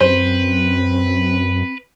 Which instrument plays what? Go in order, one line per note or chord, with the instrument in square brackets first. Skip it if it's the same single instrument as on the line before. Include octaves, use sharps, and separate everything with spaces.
[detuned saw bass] F#2 [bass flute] C4 [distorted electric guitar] B4 [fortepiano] C5